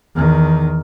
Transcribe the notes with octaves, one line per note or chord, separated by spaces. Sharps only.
E2 D#3